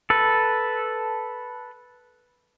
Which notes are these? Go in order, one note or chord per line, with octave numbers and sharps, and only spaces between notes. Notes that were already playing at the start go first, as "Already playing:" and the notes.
A4 B4